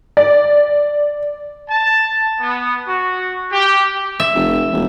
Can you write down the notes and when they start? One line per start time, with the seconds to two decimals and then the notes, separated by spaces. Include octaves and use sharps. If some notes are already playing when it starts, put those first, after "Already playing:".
0.17 D5
1.70 A5
2.40 B3
2.86 F#4
3.51 G4
4.20 E5
4.35 F1
4.73 E1